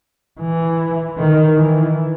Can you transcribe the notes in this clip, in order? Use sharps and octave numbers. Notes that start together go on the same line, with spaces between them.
E3
D#3
E3